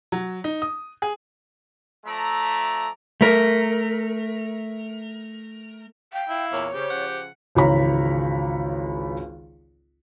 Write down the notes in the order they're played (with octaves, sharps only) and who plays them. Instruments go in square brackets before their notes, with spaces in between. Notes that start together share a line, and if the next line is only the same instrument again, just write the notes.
[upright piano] F#3
D#4
D#6
G#4
[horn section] F3 A3 D5 E5 A#5
[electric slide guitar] A3 A#4
[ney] F5 [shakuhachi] G5
[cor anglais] E4 [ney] F5
[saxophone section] E2 A#2 A#3 [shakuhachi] C#5
[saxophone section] C#3 [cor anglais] G4 [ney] C5
[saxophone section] C#3 F3 F#5
[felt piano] G#1 C#2 E3 C#5 A#5 B5